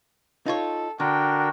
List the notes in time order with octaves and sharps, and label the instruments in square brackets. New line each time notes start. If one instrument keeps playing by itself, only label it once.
[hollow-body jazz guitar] D#4 F4 C#5 [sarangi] A4
[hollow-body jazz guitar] D3 [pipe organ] D4 F#4 A#4 [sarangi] G5